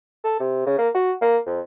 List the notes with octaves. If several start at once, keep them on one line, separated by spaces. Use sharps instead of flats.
A4
C3
C#3
A#3
F#4
A#3
F2